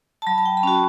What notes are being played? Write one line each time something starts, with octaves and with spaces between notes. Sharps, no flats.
A5
F#3 B5
A5
G5
B5
C#4 F#4 A5